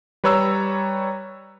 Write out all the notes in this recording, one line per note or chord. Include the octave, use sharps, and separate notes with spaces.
G3 B4 C#5 A#5 E6